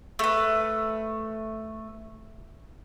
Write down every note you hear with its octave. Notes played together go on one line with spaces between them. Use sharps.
A3 B4